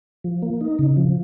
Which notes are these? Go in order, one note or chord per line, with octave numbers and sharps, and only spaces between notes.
F3
A#3
D#4
C#3
F3